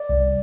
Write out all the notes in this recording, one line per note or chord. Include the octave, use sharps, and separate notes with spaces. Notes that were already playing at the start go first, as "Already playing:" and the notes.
Already playing: D5
C2